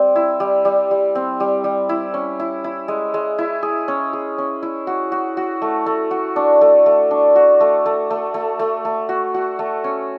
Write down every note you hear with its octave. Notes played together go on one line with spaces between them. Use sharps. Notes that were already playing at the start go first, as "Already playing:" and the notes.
Already playing: G3 C4
E4
G3
G3
G3
C4
G3
G3
E4
C#4
E4
E4
G#3
G#3
E4
G#4
C#4
G#4
C#4
E4
F#4
F#4
F#4
A3
A3
F#4
D4
A3
A3
D4
F#4
A3
A3
A3
A3
A3
A3
F#4
F#4
A3
C#4